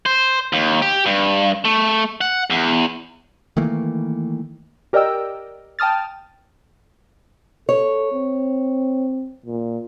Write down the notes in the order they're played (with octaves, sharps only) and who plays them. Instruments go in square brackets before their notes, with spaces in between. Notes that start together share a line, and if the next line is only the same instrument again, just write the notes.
[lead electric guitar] C5
D#2
G4
G2
A3
F#5
E2
[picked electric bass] D#3 E3 A3 A#3
[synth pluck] G4 A#4 D5 D#5 G5 E6
G5 A5 D#6 F6 A6
[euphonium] A4 [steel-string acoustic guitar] C#5
[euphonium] C4
A#2